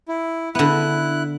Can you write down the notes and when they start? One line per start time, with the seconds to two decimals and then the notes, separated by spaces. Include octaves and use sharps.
0.08 E4
0.55 D3 B3 E4 F#6